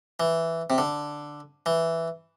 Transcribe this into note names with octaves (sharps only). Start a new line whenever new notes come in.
E3
C3
D3
E3